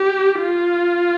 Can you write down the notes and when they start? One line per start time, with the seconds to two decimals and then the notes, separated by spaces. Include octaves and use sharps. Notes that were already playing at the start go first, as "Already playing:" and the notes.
Already playing: G4
0.39 F4